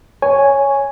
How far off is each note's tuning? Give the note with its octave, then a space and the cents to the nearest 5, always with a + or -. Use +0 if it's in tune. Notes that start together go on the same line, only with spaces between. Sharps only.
C#5 +0 G#5 +0